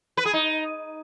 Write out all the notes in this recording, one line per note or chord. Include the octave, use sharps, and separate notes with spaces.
B4
G#4
D#4